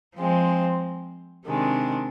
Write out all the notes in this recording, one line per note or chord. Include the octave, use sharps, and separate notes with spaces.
F3 G#3 C4
C3 D#3 G#3 D4